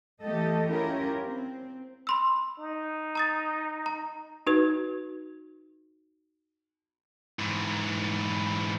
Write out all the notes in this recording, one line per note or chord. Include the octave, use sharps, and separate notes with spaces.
E3 A3 G4 A4 D#5
C#4 E4 F4 G4 A#4
C4
B5 C6 E6
D#4
A#5 D#6 A6
A#5
D#4 F#4 B4
G#2 E3